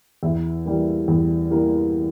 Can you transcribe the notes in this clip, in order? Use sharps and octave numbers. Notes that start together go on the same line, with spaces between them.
E2 E5
E3 G3 A#3
E2
E3 G3 A#3